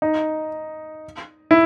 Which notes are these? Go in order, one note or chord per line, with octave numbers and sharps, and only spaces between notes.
D#4
E4